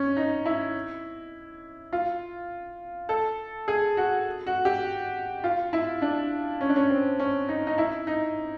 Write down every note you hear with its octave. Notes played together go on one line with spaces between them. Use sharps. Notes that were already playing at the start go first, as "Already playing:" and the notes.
Already playing: C#4
D#4
E4
F4
A4
G#4
F#4
F#4
G4
F4
E4
D4
C#4
D4
C#4
C4
C#4
D#4
D#4
E4
D#4